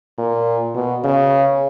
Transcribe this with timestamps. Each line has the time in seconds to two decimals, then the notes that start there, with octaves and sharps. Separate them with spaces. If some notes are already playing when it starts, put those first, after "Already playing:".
0.18 A#2
0.75 B2
1.04 C#3